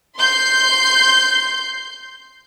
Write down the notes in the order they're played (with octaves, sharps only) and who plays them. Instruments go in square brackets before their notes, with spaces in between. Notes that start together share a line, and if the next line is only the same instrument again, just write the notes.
[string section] C6 G6 C7